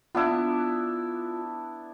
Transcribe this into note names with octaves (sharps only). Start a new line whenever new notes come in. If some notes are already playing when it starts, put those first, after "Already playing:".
B3 D4 E4 F4